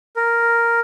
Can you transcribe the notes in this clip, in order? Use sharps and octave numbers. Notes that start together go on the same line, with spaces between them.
A#4